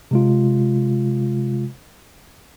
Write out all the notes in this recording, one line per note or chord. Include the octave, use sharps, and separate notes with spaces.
C3 G#3 F4